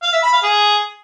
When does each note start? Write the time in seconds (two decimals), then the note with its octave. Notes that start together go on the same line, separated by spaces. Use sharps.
0.03 F5
0.13 E5
0.23 B5
0.33 F5
0.43 G#4